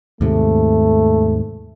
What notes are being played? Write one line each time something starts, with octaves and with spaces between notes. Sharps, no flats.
D#2 G#2 C3 A3